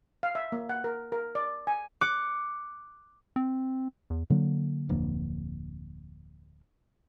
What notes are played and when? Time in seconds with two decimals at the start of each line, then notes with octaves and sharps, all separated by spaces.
0.23 F5
0.35 E5
0.52 A#3
0.69 F#5
0.84 A#4
1.12 A#4
1.35 D5
1.67 G#5
2.01 D6 F#6 C#7
3.36 C4
4.10 E2
4.30 D3 F#3 A#3
4.89 D1 F2 D3 A#3